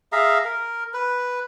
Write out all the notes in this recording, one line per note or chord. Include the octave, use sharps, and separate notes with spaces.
G#4 E5 F5 A#5
A#4
B4